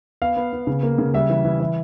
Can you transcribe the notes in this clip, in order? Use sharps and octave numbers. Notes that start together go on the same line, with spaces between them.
B3 F5
B3
B3
C#3
A#3
C#3
G3 E5
E3
E3
E3